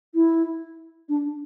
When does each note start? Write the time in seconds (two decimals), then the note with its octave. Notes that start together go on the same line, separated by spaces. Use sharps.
0.14 E4
1.09 D4